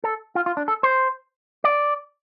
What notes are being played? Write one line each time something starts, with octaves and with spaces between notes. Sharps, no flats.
A4
F4
F4
D4
A4
C5
D5